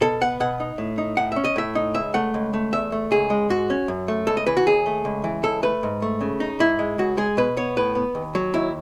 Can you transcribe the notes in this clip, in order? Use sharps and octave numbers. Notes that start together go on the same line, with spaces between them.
B2 A4
B3 F#5
B2 F#5
D#4
A2
D#4
A2 F#5
C#4 E5
D#5
A2 E5
D#4
C#2 E5
A3 F#5
C#2
A3
E2 E5
A3
C#2 G#4
G#3
G#2 F#4
C#4
F#2
A3
C#2 A4
D#5
E3 B4
F#4
D#2 G#4
A3
C#2
E3
C#2 A4
A3 B4
G#2
A3
C#3
D#4
G#2 E4
G#3
C#2 F#4
G#3 G#4
B2 B4
B3 C#5
A2 B4
B3
D#2
F#3
D#2 E4